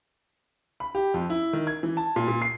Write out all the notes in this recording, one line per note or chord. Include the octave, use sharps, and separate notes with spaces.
B5
G4
F2
E4
D#3
G#6
E3
A5
A#2
A#2
C7